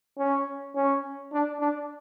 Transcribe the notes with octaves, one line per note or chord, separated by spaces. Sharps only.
C#4
C#4
D4
D4